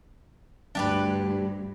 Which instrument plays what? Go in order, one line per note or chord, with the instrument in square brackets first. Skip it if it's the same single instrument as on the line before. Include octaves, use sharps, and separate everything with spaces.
[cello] D2 G2 [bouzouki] D4 G4 B4